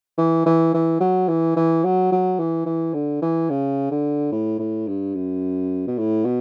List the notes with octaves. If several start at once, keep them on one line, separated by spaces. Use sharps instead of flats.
E3
E3
E3
F#3
E3
E3
F#3
F#3
E3
E3
D3
E3
C#3
D3
A2
A2
G2
F#2
B2
A2
B2